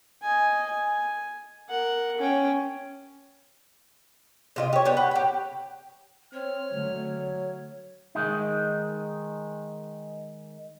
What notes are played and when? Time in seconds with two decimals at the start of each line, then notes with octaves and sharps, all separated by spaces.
0.22 D#5 G#5
0.66 G#5
1.69 A#4 F#5
2.18 C#4 G5
4.56 C3 F4 D#5
4.73 G4 C#5
4.85 B3 D4 G4 C#5
4.97 B4 F#5 G5
5.11 G4 C#5
6.34 C4 C#5 F6
6.72 D3 F#3 A3
8.15 D#3 G#3 D#4